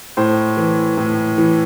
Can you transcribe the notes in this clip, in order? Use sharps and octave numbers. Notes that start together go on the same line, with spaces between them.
A2 C5
E3
A2
E3